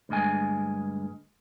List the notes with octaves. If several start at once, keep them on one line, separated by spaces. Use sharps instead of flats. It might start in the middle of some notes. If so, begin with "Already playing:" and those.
D2 G2 G#3 G#5